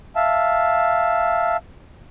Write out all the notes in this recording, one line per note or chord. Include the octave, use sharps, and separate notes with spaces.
E5 F5 A5